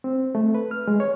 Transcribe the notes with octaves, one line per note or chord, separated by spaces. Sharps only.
C4
A3
B4
F6
G#3
C#5